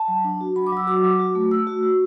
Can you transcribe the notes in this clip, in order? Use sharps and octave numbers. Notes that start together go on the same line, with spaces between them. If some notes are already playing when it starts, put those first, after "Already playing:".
Already playing: A5
F#3
D4
F#4
F#3 B5
D6
F#3 E6
F#4 D6
F#3
F#4
A3
A3 E6
F#4
F#4